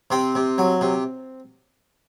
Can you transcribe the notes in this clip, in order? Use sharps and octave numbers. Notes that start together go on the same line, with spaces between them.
C3 C4
C3
F#3
C3